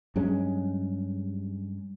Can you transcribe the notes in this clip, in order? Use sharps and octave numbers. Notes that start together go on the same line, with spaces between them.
G2 F#3 G#3 C#4